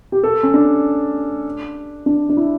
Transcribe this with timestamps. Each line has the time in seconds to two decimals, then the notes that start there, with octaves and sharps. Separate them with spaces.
0.12 G4
0.24 A4
0.43 C#4
0.54 D4
2.06 D4
2.30 D4
2.37 E4